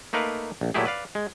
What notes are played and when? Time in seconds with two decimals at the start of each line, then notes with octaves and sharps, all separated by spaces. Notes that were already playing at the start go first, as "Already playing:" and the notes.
0.13 A3 A#3 D#4 A#4 B4 F5
0.61 A#1
0.74 A#2 F#3 A3 E4 G4 G#4
0.86 B4 D5 F5
1.15 G#3